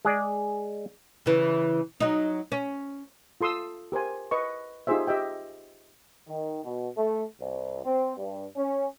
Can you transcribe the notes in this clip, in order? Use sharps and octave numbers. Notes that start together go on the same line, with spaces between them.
G#3 G#4 D5
C#3 E3
F#3 D#4
C#4
F4 A4 C6 D#6 E6
G4 A#4 C5 G#5
B4 D#5 C#6
D#4 F4 G4 G#4 C5 E5
G4 D#5 E5 G5
D#3
B2
A3
C2
C4
G2
C#4